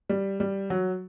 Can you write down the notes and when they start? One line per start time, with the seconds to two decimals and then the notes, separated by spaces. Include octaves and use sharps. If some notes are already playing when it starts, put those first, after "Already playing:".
0.09 G3
0.40 G3
0.70 F#3